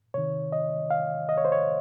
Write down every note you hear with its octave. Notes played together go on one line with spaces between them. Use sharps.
C3 D#3 C#5
D#5
F5
D#5
C#5
C5
C#5